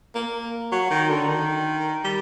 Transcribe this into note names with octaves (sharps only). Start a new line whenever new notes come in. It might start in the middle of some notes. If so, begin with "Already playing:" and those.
A#3
F#3
D#3
D3
D#3
G3